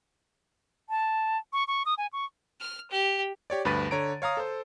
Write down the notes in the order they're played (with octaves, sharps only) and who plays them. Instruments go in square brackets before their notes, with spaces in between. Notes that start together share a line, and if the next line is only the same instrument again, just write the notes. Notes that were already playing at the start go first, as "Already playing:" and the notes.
[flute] A5
[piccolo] C#6
C#6
D#6
G#5
C#6
[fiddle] F6
G4
[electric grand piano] G4 C#5 D5
D2 G2 B4 B5 A6 D#7
D3 C#5 A#5 D7
C#5 F5 A#5 D#6
A4 C5